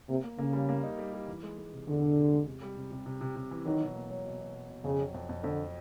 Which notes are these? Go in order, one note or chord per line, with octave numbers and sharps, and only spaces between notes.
C3 A#3
A#3
C#3 A#3
G3
A#3
D#4
G3
G3
E3
G#3
G#3
C3
E2 D3
C3
C3
G#3
C3
G3
C3
C3
C3
C3
C3
E3
D#3 F#3
B2
A#3
F#3
B2
B2
F#3
B2
F2 C#3
F#3
F2
F2
F2 D3